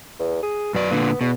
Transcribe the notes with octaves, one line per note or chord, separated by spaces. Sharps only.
E2
G#4
F#2 B2 D5
A#2 D3 B3
E2 B2